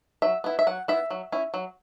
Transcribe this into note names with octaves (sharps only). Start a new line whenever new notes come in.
F#3 E5
B3 E4
E5
F#3 F#5
B3 E4 E5
F#3
C#4 E4
F#3